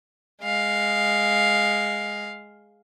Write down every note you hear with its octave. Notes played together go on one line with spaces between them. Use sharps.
G#3 F5